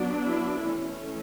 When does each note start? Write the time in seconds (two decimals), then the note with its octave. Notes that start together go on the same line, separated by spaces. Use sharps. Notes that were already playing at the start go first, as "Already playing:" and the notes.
Already playing: F#3 B3 D4
0.22 E4
0.66 E3 A3 C#4